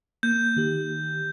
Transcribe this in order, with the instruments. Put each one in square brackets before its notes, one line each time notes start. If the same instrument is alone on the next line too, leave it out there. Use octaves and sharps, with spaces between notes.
[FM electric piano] A#3 [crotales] G6
[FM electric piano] D#3 G4